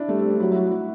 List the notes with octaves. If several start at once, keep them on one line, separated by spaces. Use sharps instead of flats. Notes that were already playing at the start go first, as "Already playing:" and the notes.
Already playing: D4 E4
G3 A3
C4
D4
F#3 E4
E4
F#4
E4
F#4